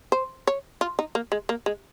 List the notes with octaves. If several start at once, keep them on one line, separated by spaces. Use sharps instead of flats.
C5
C#5
F4
D#4
A#3
G#3
A#3
G#3